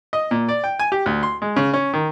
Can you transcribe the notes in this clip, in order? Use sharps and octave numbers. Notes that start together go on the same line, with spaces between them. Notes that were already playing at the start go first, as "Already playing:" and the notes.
D#5
A#2
D5
G5
G#5
G4
D2
C6
G#3
C#3
C#4
D#3